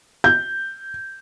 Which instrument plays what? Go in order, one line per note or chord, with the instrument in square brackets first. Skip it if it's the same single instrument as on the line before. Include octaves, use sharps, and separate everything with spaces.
[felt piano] G6